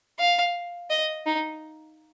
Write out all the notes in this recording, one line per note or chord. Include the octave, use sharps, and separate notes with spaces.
F5
D#5
D#4